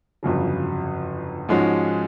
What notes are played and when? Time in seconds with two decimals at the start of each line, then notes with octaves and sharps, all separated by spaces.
0.23 G1 F2 C#3 F#3
1.49 G#2 F3 G#3 C#4 F#4